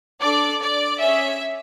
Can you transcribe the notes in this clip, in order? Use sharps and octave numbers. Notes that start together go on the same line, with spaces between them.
D4 A4 D5
D5
C#4 G#4 E5